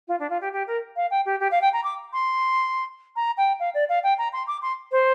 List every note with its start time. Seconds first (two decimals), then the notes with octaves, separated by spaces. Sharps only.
0.08 F4
0.20 D4
0.30 F4
0.41 G4
0.53 G4
0.67 A#4
0.96 F5
1.11 G5
1.26 G4
1.40 G4
1.51 F5
1.62 G5
1.73 A#5
1.84 D6
2.13 C6
3.16 A#5
3.37 G5
3.60 F5
3.74 D5
3.89 F5
4.03 G5
4.18 A#5
4.33 C6
4.47 D6
4.62 C6
4.92 C5